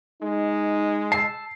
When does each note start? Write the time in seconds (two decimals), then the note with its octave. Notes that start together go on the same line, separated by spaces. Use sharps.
0.22 G#3 D#4
1.12 A5 E6 C7